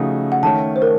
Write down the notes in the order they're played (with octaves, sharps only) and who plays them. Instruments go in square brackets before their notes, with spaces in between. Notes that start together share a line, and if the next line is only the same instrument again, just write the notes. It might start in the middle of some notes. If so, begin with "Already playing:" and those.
Already playing: [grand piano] C#3 F3 A3 D#4 F#4
[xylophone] F#5
[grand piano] D#3 A3 C#4 [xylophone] A5
[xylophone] C5
A#4